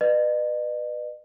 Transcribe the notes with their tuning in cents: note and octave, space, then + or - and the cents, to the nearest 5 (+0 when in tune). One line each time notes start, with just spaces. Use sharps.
B4 +0 D#5 -45